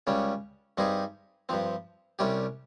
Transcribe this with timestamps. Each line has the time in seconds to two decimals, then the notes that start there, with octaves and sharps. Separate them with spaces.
0.07 C#2 C#3 G3 C#4
0.78 G2 G3 C4 D#4 G#4
1.49 G2 F3 C4
2.19 C2 C3 G3 C#4 G4